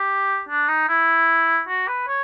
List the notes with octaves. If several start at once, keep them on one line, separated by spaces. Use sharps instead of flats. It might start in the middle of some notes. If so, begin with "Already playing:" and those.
Already playing: G4
D4
D#4
E4
F#4
B4
C#5